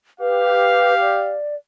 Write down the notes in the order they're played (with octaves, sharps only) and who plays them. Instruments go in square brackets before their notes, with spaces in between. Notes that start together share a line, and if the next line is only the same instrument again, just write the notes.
[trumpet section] G4 F5 [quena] B4
[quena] D5